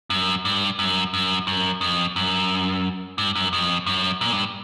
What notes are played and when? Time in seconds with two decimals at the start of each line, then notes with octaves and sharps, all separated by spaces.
0.10 F#2
0.45 G2
0.79 F#2
1.14 F#2
1.47 F#2
1.81 F2
2.16 F#2
3.18 G2
3.35 F#2
3.53 F2
3.86 F#2
4.21 A#2
4.32 G2